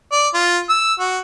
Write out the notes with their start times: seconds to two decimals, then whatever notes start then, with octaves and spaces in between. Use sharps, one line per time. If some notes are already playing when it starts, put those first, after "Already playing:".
0.12 D5
0.34 F4
0.69 E6
0.99 F#4